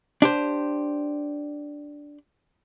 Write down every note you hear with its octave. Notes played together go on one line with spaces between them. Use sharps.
D4 G4 C5